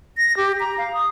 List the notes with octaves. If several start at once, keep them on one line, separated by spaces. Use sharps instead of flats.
A#6
G4
A#5
F5
D#6